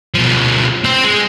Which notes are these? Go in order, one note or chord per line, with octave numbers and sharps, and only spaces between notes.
B2 F3
C4 C5
G#3